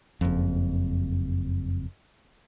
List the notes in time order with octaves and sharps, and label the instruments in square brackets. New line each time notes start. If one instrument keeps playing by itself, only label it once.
[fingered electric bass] F#1 F2